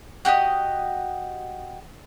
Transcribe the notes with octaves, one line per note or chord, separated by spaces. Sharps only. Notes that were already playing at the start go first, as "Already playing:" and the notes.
F#4 G4 A4 D#5